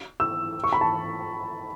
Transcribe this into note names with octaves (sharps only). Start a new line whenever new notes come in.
E6
C#6
B5
A5